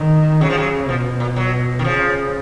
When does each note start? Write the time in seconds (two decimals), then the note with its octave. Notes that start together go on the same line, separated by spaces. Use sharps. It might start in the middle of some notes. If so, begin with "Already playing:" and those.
Already playing: D#3
0.41 C#3 F#3
0.50 F3
0.58 F#3
0.88 B2 F3
1.20 A#2
1.36 F#3
1.79 D#3
1.84 C#3 F3